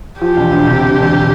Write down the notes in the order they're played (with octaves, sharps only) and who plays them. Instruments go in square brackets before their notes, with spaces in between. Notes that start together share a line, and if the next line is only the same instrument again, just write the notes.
[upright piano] F3 [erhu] G4
[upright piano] E1
D2
C3
D2
E1